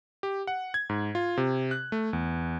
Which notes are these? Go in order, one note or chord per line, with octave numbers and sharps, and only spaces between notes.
G4
F#5
G#6
G#2
F4
C3
F#6
A3
E2